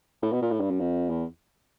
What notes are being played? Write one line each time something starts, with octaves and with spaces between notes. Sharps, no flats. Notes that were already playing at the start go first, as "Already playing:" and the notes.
A2
B2
A#2
A2
G2
F#2
F2
E2